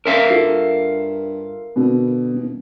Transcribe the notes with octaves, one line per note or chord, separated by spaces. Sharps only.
C#4 A#4 E5 F5
G2 F4 A4
B2 D3
D#1